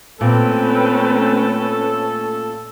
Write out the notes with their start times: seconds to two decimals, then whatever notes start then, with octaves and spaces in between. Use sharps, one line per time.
0.21 A#2 A3 C4 C#4 A4 B4